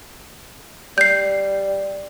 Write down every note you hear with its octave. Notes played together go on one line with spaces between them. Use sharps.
G3 G6 C7